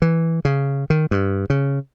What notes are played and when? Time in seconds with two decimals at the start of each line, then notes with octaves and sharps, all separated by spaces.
0.02 E3
0.45 C#3
0.90 D#3
1.11 G2
1.50 C#3